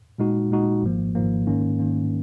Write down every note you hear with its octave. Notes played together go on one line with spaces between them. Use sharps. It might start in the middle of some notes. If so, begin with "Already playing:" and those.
A#2 G#3 D#4 F#4
A#2 G#3 D#4 F#4
G#1 G#2 F3 A#3
G#1 G#2 F3 A#3
G#2 D#3 A#3 C#4
G#2 D#3 A#3 C#4